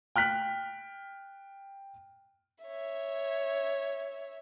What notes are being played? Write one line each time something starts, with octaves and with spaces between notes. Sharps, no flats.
G5 F6 F#6 B6
C#5 E5